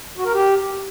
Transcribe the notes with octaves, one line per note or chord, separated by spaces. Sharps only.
F#4
A#4
G4